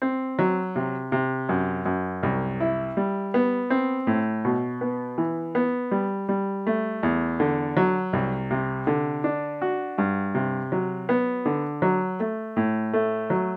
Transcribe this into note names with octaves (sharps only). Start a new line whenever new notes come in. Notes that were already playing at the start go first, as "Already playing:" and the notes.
C4
F#3
C3
C3
F#2
F#2
C2
E4
G3
B3
C4
A2
B2
B3
E3
B3
G3
G3
A3
E2
D3
F#3
C2
C3
D3
D4
F#4
G2
C3
F#3
B3
D3
F#3
A3
A2
A3
F#3